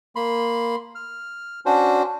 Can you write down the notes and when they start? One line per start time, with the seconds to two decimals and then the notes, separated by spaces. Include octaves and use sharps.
0.16 A#3 B5 C6
0.95 F6
1.66 C#4 D4 F#4 C5